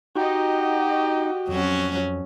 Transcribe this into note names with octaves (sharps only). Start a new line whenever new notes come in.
D#4 F#4 G4 D#5
F2 F#3 C#4